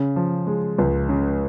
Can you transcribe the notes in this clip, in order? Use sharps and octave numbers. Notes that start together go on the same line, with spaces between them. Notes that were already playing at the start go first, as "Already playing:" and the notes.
Already playing: C#3
F3
G#3
C#2
C#3